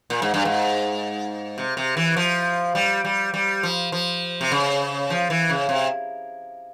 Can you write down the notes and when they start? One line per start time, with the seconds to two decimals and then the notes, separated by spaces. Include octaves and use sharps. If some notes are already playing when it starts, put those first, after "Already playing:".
0.10 A#2
0.22 G#2
0.34 G2
0.45 G#2
1.58 C3
1.77 C3
1.97 E3
2.17 F3
2.75 G3
3.04 G3
3.34 G3
3.63 F3
3.92 F3
4.41 C3
4.52 C#3
5.10 F3
5.30 E3
5.50 C#3
5.69 C3